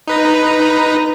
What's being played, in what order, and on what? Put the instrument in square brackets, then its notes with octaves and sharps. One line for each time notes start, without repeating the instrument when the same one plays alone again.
[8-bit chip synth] D#4 B4 A#5